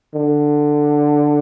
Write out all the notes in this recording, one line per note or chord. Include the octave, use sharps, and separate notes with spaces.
D3